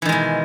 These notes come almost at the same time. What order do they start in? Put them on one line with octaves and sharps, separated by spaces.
E3 D#3 G#3 B2